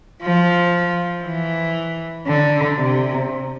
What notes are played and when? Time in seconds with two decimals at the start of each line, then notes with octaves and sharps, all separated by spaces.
0.23 F3
1.24 E3
2.27 D3
2.77 C3